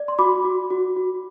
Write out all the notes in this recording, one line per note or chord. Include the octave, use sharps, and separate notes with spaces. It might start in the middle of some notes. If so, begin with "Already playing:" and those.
Already playing: D5
C6
F#4 B5 D6
F#4
F#4
F#4